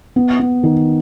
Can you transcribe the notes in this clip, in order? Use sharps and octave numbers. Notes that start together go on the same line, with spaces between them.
B3
B3
D#3